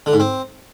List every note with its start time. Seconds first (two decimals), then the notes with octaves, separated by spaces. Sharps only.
0.06 D3
0.13 G#2
0.20 C4